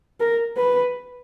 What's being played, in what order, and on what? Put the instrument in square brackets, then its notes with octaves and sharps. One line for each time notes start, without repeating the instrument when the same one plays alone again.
[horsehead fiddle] A#4
B4